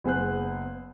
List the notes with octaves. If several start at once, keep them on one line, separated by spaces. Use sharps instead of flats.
F#1 B3 G#4 C5 F#6